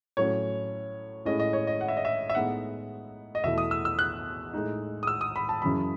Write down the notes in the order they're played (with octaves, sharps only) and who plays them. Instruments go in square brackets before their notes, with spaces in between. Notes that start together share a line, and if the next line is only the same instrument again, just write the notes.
[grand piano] A2 F#3 C#4 C#5
A2 G#3 C#4 E4 D#5
D#5
C#5
D#5
F#5
E5
D#5
E5
E5
A2 G#3 B3 D#4 F#5
D#5
E2 B2 A3 E4 E5
D#6
E6
E6
F#6
A2 G#3 D#4
D#6
E6
D#6
B5
A5
F#2 C#3 E3 B5